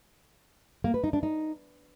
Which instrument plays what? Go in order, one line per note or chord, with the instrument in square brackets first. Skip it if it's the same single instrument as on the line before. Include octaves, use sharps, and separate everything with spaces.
[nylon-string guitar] A#3
B4
D#4
D4
D#4